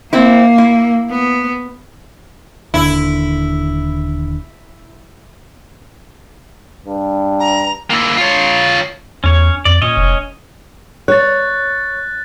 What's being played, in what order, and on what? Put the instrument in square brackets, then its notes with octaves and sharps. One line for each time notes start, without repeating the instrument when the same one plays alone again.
[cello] A#3 [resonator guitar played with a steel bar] C4 E4
[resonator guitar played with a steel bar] E4
[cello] B3
[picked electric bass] D#1 D3 [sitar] E4
[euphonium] G2
[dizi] A#5
[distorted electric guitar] A#3 E4
F4 C#5
[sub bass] E2 [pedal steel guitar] C#4 C#5
[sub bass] F2 [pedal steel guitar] D5
[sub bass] A#2 [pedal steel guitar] C#4 C#5 D#5
[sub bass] F1
[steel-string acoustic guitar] C#5 [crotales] F#6 A6